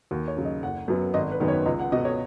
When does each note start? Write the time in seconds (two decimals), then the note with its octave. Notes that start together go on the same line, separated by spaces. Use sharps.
0.11 D#2 F#4
0.28 C#5
0.37 C#3 F#3
0.45 D#5
0.63 F#1 F#5
0.88 F#2 F#3 B3
1.14 G#1 D#5
1.32 B4
1.40 F#2 D#3 B3
1.48 C#5
1.65 C#2 D#5
1.79 F#5
1.92 B2 D#5
1.95 B3
2.05 C#5